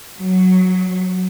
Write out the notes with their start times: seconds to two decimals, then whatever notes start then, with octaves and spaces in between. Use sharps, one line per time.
0.17 F#3